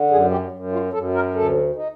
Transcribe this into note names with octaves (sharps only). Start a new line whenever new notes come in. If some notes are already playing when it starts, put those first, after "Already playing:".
Already playing: D3
F#2 G#4
G4
F#2
F4
F#2 A4
A#4
D2 A4
D#4